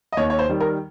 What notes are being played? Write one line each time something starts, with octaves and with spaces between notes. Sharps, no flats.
D#5
D#2 C#5
C#5
C5
D#3 G3
A#4